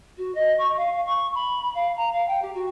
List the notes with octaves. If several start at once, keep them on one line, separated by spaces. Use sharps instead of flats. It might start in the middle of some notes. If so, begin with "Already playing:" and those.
F#4
D#5
C#6
F5
C#6
B5
F5
A#5
F5
G5
G4
F#4